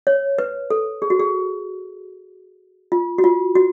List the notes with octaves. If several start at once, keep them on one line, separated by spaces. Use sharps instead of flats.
C#5
B4
A4
G#4
F#4
G#4
F4
F#4
F4
F#4